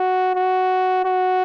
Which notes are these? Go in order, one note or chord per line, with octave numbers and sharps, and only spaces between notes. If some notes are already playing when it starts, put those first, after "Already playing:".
Already playing: F#4
F#4
F#4